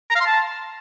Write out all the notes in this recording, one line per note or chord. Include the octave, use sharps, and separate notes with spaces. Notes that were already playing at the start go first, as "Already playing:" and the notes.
A#5
F5
C6
A5